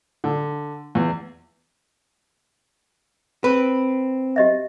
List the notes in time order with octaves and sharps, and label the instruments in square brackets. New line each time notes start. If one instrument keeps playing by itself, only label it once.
[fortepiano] D3
E2
[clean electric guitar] C4 [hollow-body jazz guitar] B4
[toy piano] G4 D#5 E5